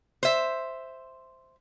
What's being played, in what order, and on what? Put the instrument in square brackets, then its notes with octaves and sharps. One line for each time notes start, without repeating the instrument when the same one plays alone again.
[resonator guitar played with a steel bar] C5 E5